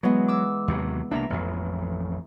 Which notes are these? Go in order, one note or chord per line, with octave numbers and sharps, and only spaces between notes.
E3 F#3 G#3 B3
D6 E6
D#2 C3 F#3
C2 A#3 D4 E5 A#5
A1 F2